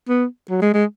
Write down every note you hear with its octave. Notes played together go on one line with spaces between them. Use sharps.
B3
F#3
G#3
G#3